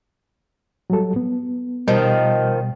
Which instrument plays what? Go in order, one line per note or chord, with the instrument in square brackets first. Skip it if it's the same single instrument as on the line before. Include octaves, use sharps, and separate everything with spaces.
[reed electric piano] F#3 G3 A4
B3
[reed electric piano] B2 G3 [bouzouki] D#3 F3